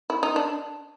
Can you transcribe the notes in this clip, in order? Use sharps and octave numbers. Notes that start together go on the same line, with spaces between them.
E4
D#4
D4